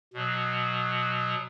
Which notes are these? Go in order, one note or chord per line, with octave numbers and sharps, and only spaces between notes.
B2 F#3